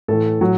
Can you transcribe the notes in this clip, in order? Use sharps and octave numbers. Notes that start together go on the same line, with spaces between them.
A2 E3 A4
A2 F#3